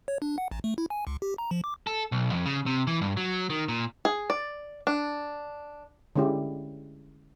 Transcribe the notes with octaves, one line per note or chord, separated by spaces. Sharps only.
C#5
D4
F#5
A1
A3
E4
G#5
C#2
G4
A#5
F3
D6
A4
B1
F2
C#3
C3
E3
G2
F#3
D#3
A#2
G#4
D5
D4
D3 G#3 C#4 E4 G4